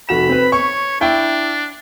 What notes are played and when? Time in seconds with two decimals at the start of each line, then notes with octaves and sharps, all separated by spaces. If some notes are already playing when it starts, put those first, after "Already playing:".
0.09 F1 F#4 B5 E7
0.29 C4 B4
0.52 C#5 C#6
1.01 D4 E4 G5